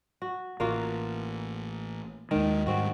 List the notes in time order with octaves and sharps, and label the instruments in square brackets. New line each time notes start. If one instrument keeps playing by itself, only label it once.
[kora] F#4
[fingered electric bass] A1 [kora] A#3 F4 F#4
[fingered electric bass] D#2 G#3 [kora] D#3
[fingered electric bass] G#2 G3 [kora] C4 F#4